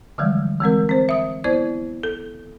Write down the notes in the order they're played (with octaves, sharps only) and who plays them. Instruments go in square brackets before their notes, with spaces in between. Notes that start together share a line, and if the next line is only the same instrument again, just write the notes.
[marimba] D3 E3 F3 G3 G#3
E3 G#3 C4 A#4
C4 C5
E5 D#6
B3 E4 C5 D5 G#6
A4